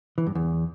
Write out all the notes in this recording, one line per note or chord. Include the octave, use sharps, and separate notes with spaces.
E3
G2
E2